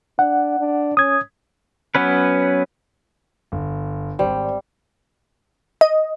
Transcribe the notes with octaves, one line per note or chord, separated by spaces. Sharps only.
D4 F#5
D4
C#4 D#6 G#6
F#3 B3 C#4 B4
G1
G#1 G3 C5
D#5